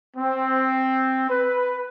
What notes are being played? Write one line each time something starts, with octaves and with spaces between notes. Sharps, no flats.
C4
B4